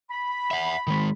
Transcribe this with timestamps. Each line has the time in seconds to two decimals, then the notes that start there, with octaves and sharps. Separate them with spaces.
0.11 B5
0.51 E5 F#5
0.87 D#3 G#3